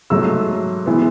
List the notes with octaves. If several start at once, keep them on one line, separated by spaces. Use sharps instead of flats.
G#2 F#3 A3 E6
E3 G#3 B3